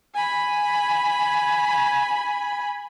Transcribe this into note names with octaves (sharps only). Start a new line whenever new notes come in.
G#5 B5